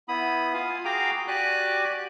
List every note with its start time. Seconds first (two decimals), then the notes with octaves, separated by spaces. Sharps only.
0.08 B3 E4 B5 D#6
0.54 F4 F5 G#5
0.85 F#4 G#4 F5 G5 A#5 D6
1.28 F#4 G4 D5 G#5 D6 F#6